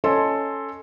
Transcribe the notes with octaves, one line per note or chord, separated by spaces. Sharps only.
C#4 A4 D#5 G#5 C6